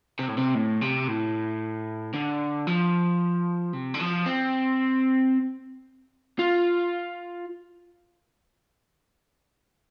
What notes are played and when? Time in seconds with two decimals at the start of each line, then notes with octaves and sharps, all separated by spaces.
0.19 C3
0.28 A2
0.37 C3
0.55 A2
0.81 C3
1.08 A2
2.14 D3
2.67 F3
3.73 C3
3.94 D3
4.00 F3
4.26 C4
6.39 F4